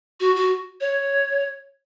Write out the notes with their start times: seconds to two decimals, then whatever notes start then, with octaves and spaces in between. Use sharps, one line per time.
0.20 F#4
0.36 F#4
0.81 C#5